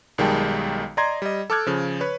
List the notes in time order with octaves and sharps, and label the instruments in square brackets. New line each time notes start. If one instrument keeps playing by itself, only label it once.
[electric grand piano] B1 D#3 G3 G#3 G5 A5
D5 D#5 A#5 C6 G#6
G3 D#5
A4 A5 D6 F6 F#6 G#6
C#3 F3
B4 C#5